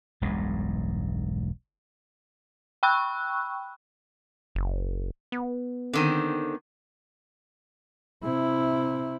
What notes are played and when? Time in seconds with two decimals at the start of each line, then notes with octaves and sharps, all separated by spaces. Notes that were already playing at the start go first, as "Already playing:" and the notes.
0.22 E1 B1 G2 G#3
2.83 G5 B5 C#6 E6 F#6
4.55 F#1
5.32 B3
5.93 D3 D#3 C4
8.23 C3 E4